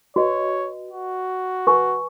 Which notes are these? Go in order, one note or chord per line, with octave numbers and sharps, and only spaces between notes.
F#4 B4 C#5 D#5
F#4
B4 G#5 C#6